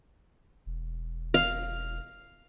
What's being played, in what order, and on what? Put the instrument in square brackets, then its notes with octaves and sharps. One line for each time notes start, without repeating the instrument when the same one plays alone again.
[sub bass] E1
[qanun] F5